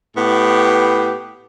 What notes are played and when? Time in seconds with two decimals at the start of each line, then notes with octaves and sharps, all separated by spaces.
0.16 A2 B3 G4